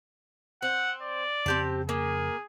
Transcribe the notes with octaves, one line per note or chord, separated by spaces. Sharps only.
C4 F#5
D5
F2 C#3 C4 C#4 G4 A5
A#3 G#4